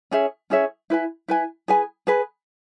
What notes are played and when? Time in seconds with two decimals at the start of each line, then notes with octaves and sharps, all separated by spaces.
0.11 C#4 G#4 C#5 E5
0.50 C#4 G#4 C#5 E5
0.90 E4 B4 G#5
1.28 E4 B4 G#5
1.68 G#4 B4 G#5
2.07 G#4 B4 G#5